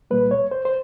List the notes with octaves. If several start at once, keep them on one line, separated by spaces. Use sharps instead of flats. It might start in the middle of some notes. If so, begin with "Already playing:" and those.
C2 A#2 G3 A#3 B4
C#5
C5
C5